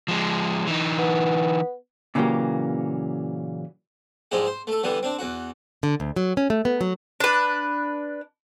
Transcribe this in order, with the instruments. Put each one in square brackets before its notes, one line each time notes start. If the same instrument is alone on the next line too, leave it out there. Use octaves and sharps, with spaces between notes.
[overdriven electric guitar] F3 G#3
E3 D#4
[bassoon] B3
[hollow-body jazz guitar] A#2 C#3 E3 F#3 A#3 G4
[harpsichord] G#2 F3 G3 G#3 E4
C5
A3 A4
D3 E3 G3 B3
C4 D4
E2 F#4
[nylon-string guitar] D3
D2
F#3
C#4
A3
B3
F#3
[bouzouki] D4 B4